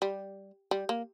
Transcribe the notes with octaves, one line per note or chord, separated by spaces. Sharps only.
G3
G3
A#3